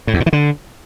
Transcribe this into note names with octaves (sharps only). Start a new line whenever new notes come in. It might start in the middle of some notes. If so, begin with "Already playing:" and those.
A2
E2
A#2
E3
D3